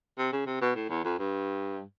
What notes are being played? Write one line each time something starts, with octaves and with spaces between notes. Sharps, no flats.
C3
C#3
C3
B2
A2
E2
F2
G2